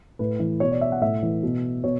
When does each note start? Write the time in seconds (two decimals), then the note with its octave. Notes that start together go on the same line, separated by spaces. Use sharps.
0.19 A2 B4
0.40 E3
0.60 B2 C#5
0.72 D5
0.81 E5
0.92 F#5
1.01 A2 E5
1.23 E3
1.43 B2
1.84 B2 C#5